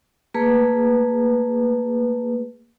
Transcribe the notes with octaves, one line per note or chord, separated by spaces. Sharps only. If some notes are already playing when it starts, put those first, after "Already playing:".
A3 A#3 G#4 B4